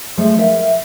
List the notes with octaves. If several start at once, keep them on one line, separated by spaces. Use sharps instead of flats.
F3 G#3 A3
A#4 E5 F5